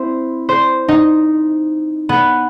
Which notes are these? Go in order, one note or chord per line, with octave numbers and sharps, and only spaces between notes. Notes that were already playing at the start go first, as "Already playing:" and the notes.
Already playing: C4 E4 C5
C5
D#4
B3